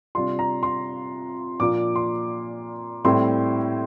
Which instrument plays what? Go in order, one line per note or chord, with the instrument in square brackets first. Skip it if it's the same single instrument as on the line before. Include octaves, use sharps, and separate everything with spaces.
[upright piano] C3 G3 D4 F4 C6
A#5
C6
A#2 F3 A#3 D4 F4 D6
C6
A2 G3 C4 E4 C6